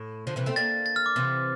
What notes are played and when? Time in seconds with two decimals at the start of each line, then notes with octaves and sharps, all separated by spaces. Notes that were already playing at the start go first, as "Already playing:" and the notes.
Already playing: A2
0.27 D3 F3
0.36 C3 E3
0.46 A3 C4
0.56 A#3 D4 A6
0.86 A6
0.96 F6
1.06 D6
1.16 C3 E3